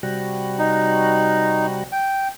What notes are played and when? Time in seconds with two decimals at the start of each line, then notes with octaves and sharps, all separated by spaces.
0.03 C3 G3 F#4
0.59 D#4
1.92 G5